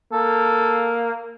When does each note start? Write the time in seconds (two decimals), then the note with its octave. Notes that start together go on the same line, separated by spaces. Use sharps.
0.13 A#3 A4